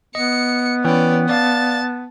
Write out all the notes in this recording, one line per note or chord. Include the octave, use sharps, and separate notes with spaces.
B3 D#5 C#7
E3 C#4 B4 D5 G5
D5 F5 A5 A6